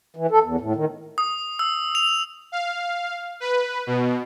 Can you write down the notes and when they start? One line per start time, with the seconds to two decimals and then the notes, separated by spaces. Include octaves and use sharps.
0.16 E3
0.31 A4
0.43 E2
0.60 A2
0.75 D#3
1.18 D#6
1.59 E6
1.95 F7
2.52 F5
3.40 B4
3.87 B2